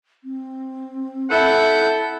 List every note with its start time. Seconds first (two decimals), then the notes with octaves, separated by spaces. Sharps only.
0.24 C4
1.31 E4 A4 F#5 G6